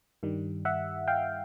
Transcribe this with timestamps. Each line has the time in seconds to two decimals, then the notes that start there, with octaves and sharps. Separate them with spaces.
0.23 G2 D#3 G3
0.65 E5 F#5
1.08 F5 G5